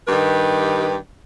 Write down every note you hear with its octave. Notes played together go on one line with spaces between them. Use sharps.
G2 D#3 G4 B4